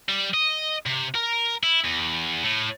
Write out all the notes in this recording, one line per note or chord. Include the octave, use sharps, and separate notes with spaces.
G3
D#5
C3
A#4
E4
E2
A2